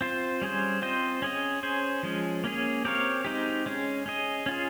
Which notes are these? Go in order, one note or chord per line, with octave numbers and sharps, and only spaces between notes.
C4 F4 C5
G3 C#4 G#4 C5
C4 F4 C5 D#5
C#4 G#4 D#5
C#4 G#4 C5
F3 G#3 C#4
A#3 C#4 G#4
C4 G4 A#4 C#5 F5
G#3 C4 D#4 G4
G#3 C#4 G#4
C#4 G#4 D#5
C#4 F4 G#4